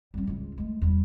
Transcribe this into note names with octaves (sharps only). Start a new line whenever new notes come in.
G3 C#4
C#2 F4
G#3 A3
E2 G3